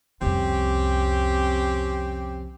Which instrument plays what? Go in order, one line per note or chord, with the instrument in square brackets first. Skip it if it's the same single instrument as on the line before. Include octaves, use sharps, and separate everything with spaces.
[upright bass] C2 F2 [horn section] C4 C#4 G4